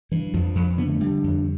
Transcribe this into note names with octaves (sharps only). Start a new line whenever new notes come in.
G2 E3
F2 F3
F2
D3 B3
A3
D3 G3
F2